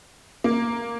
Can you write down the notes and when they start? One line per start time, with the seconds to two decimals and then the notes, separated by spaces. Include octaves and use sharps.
0.44 A#3